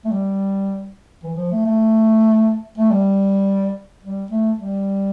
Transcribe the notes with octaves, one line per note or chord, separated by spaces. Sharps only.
A3
G3
E3
F3
A3
A3
A3
G3
G3
A3
G3